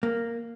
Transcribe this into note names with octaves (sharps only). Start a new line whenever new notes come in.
A#3